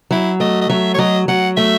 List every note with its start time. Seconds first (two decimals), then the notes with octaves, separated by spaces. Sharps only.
0.11 F#3 E4
0.40 A3 D#5
0.61 D#5
0.69 F#3 E5
0.94 C#5
0.98 F#3 D#5
1.28 F#3 F#5
1.57 A3 E5